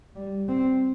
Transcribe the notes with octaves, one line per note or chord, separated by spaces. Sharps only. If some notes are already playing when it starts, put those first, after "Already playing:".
G3
C4